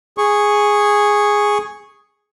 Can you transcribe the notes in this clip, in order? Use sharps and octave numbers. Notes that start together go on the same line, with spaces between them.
G#4 C#6